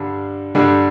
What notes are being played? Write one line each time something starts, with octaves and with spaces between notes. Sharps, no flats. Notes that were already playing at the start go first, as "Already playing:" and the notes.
Already playing: G2 D3 G3 D4
G2 D3 G3 D4